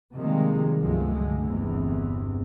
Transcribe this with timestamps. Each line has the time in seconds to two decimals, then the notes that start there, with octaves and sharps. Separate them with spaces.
0.15 C3 D#3 F3 G3 G#3 A#3
0.81 C#2 G2 F3 F#3 G#3 A3
1.12 D3 G#3
1.47 G1 E2 G2 C3 E3